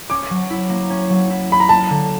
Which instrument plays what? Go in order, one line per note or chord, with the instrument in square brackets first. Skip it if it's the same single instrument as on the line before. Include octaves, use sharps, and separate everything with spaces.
[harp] C#4 [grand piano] D6
[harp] F#3
E4
A#3
C#4
F#3
E4
[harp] A#3 [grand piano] B5
[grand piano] A#5
[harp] A#3 [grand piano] A5
[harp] D3